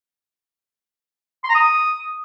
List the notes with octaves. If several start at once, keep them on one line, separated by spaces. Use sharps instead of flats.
C6
A#5
D#6